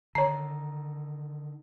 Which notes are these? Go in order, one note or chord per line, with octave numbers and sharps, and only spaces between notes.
D3 D#3 C#5 A#5 C7